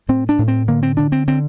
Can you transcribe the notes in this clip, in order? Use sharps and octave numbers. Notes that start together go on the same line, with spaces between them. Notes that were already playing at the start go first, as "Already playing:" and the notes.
A2 C4
D4
A2
C4
D3 A#3
C4
D3 D4
C4
D3 C4